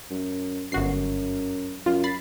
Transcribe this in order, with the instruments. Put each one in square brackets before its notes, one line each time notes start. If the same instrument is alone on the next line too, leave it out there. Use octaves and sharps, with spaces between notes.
[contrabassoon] F#2
[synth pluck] G1 F#4 C7 [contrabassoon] F#2
[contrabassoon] F#2 [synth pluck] F4
[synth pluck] B5 A6 C7